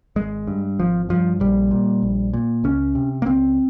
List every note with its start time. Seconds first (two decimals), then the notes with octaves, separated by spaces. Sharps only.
0.16 G#1 G#3
0.47 G2
0.79 G#1 F3
1.09 G2 F3
1.40 A#1 G3
1.71 A#2
2.03 A#1
2.33 A#2
2.64 C#2 C#4
2.95 C3
3.22 A#3
3.26 C#2 C4